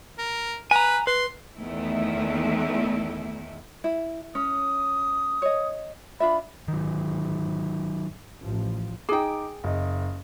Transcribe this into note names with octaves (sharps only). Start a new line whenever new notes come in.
A#4
B4 G#5 A#5
B4 C6
E2 D#3 A3 E4
E4
C#4 D#6
C#5 D#5
D4 F4 E5 B5
G#2 D3 D#3 F#3
A1 F3
D#4 G#4 G5 D6
F#1 D#5